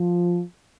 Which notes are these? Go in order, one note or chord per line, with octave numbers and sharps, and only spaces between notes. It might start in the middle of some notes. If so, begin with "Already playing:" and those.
Already playing: F3